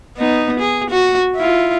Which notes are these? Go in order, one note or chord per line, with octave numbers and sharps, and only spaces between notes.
B3 D#4
G#4
F#4
E4 F4